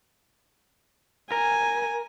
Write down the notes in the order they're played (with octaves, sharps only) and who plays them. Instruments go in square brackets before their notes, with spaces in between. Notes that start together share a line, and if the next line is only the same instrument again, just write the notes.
[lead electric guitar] A#4 [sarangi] G#5